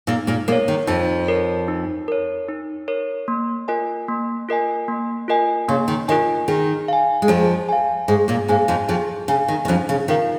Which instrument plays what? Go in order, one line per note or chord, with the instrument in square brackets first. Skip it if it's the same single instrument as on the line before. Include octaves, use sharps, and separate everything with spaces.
[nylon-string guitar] A#2 A#3 [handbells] D#4
[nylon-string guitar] A#2 A#3
[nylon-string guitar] A#2 A#3 [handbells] A#4
[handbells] C#5
[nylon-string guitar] D#3
[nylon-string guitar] F2 F3 [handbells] D#4
[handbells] A#4 C#5
D#4
A#4 C#5
D#4
A#4 C#5
A#3
F4 A#4 D#5 G#5
A#3
F4 A#4 D#5 G#5
A#3
F4 A#4 D#5 G#5
[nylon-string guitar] C#3 [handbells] A#3
[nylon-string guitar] D#3
[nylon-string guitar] D#3 [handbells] F4 A#4 D#5 G#5
[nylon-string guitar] D#3 [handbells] G#4
[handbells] F5 G#5
[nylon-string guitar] G#3
[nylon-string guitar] F2 F3 [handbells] G#4
[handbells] F5 G#5
[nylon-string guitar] G#2 G#3 [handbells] G#4
[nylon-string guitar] A#2 A#3
[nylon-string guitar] G#2 G#3 [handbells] G#5
[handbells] F5
[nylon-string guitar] F2 F3
[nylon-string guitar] F2 F3 [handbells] G#4
[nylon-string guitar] C#3 [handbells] F5 G#5
[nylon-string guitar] D#3
D#3
[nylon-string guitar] F2 F3 [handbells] C#4
[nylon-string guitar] C#3
[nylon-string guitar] D#3 [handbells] F4 A#4 F5